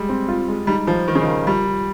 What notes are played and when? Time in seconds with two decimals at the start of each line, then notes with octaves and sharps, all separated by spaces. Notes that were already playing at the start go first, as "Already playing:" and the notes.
Already playing: G3 G#3
0.09 C4
0.28 F4
0.48 G#3
0.67 G3 D#4
0.87 F3 D#4
1.07 D#3 D#4
1.15 C#3
1.22 D#3
1.27 A#4
1.47 F3 G3
1.67 F3